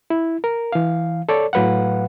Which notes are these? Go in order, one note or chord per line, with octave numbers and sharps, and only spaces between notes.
E4
A#4
E3 F5
A4 C#5 D5
A2 F#3 B4 F5 F#5